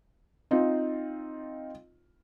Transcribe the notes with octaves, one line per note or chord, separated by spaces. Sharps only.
C4 D#4 F4